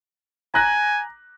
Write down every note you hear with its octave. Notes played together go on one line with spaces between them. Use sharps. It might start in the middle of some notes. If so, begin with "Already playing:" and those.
G#5 A#5 F#6 A#6